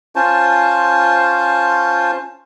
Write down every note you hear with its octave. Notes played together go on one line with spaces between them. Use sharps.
C#4 F4 C5 A5